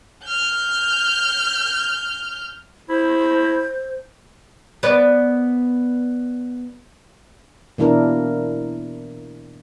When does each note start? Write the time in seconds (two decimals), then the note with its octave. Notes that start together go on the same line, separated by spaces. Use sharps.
0.24 F6 G6
2.89 E4 C5
4.83 B3 D5
7.78 B2 E3 A#3 D4 E4 A#4